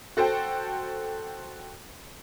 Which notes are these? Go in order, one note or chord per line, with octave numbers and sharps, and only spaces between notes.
F#4 A4 C5 G5